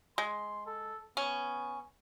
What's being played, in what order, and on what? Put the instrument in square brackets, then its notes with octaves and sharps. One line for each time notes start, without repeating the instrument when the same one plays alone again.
[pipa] G#3 [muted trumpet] C6
[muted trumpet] A4
[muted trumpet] B3 [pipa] C#4